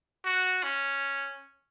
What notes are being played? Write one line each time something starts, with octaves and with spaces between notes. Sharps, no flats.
F#4
C#4